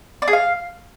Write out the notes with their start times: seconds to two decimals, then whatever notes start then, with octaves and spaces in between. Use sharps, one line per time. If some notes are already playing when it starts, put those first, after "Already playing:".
0.22 D5
0.28 G#4
0.33 F5